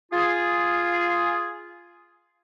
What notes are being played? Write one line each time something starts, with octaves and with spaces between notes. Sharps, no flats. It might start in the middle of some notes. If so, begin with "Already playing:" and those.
F4 G#4